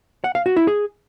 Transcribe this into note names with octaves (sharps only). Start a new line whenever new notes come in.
F#5
F5
F#4
E4
G#4